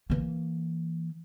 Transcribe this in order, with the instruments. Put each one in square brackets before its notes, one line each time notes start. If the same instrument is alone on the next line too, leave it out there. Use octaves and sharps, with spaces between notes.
[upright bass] E3 A#3